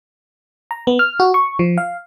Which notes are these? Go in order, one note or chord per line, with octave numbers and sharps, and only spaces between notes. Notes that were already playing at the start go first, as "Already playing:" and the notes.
A#5
B3
F6
F#4
C#6
F3
F5